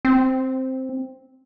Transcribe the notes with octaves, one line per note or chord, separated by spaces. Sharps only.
C4